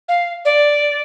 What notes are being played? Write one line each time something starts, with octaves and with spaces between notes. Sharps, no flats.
F5
D5